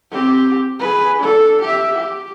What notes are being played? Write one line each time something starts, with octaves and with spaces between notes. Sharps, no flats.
C4 G4
G#4 B4
D4 A4
G4 E5
G4